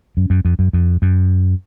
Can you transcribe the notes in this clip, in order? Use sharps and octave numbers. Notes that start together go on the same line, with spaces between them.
F#2
F#2
F2
F#2
F2
F#2